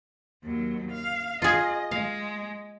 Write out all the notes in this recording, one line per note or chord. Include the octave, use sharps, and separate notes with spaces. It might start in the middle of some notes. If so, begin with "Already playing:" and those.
D#2 F#3
F5
F4 G#4 D#5
G#3 F5